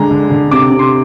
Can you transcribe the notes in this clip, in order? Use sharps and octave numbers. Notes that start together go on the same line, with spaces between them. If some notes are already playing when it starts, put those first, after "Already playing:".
Already playing: D3 G#3 G#5 A#5
D3
D3
C3 D6
C3
C6